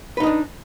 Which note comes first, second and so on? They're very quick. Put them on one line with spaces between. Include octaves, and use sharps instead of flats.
B4 D#4 D#5 D4